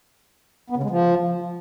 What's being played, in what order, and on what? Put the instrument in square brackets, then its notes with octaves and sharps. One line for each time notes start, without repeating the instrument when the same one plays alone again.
[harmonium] B3
C#3
G#3
F3